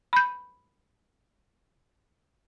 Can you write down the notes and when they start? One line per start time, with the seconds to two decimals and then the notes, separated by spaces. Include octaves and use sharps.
0.13 B5 G6